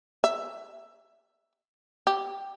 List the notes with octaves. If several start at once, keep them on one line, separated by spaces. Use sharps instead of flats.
E5
G4